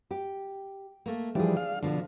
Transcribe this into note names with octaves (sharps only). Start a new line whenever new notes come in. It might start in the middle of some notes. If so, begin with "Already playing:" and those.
G4
A3 A#3
E3 F3 G3 D4 G#4
F5
B2 D3 F3 F4